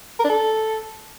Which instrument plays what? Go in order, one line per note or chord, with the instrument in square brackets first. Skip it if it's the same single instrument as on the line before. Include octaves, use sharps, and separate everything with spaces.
[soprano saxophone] A#4
D4
A4